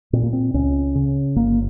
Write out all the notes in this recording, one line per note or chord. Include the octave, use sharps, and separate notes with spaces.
A#2 C4
A#3
C4
C#2 C#4
C#3
G1 A#3